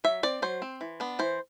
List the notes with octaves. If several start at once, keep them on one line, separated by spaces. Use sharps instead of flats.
F#3 E5
C4 D5
F#3 C5
C4
E3
B3 D4
E3 C5